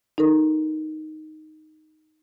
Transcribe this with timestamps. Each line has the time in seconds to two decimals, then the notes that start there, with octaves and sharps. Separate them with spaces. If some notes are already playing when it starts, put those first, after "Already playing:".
0.18 D#4 A4 A#4